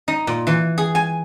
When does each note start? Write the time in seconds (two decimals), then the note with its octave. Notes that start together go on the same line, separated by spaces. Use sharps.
0.08 D#4
0.27 A#2
0.47 E3
0.78 G#4
0.95 G#5